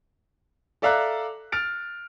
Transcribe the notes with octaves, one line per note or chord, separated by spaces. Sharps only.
A4 D5 E5 F5 A#5 F#6
F6 A6 D7